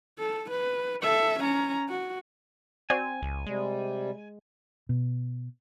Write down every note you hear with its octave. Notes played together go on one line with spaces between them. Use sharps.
A4
B4
A4 E5
C#4 A#5
F#4
C4 F#4 C5 D5 G#5
C#2
C3 G3 G#3
B2